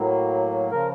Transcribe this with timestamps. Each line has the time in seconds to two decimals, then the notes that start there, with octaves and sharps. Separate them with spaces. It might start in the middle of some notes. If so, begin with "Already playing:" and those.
Already playing: A2 F#3 A#3
0.71 C#3 F3 A#4